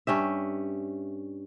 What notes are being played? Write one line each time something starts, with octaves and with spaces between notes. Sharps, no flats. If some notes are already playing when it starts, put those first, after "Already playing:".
G2 C#4 G4 E5